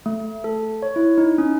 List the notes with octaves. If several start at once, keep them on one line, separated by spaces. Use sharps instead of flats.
A3
A4
C#5
E4
D#4
C#4